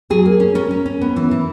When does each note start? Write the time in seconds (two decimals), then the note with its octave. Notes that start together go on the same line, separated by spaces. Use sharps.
0.10 F#3 G#4
0.25 A#3
0.40 C#4
0.55 C#4 A#4
0.71 C#4
0.86 C#4
1.01 B3
1.16 E3
1.31 E3